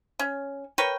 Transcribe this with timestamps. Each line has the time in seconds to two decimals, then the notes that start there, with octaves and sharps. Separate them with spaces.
0.19 C#4
0.78 A#4 B4 C#5 G5